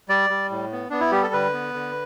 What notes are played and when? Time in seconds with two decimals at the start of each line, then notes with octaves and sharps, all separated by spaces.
0.09 G3 D5
0.30 G3
0.50 A2
0.72 B3
0.90 B3 D4
1.00 E4
1.12 G3 G4
1.23 A4
1.33 D3 B4
1.53 B3
1.74 D3